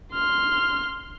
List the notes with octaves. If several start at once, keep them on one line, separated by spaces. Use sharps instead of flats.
C6 F6